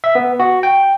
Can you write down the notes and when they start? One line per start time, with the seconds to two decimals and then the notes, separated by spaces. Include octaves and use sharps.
0.04 E5
0.15 B3
0.40 F#4
0.63 G5